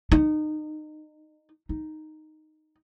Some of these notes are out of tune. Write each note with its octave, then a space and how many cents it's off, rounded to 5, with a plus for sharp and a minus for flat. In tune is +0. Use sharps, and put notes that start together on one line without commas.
D#4 -25
D#4 -5